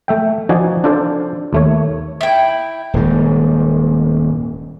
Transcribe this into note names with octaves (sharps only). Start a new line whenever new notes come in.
A3 E5 G5
F3 D#4 F#4 D5 G#5
D4 F4 A4 C5 D5
D#2 A3 C#5
E4 G5
D#1 G#2